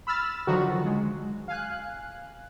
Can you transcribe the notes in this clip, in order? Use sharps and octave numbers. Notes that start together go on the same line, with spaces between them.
B5 E6 F6 A6
D3 D#3 F3 F#3 F#4
G#3
F5 G#5 F#6